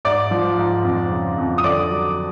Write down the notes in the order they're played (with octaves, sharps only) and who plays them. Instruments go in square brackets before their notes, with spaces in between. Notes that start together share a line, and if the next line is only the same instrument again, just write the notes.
[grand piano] G#2 D5 D6
F3
G#2
F2
C#3
F2
D#6
D3 D5 D6
F#3